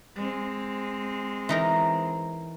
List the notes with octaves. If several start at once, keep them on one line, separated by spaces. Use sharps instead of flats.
G#3 C4
E3 D#4 A#4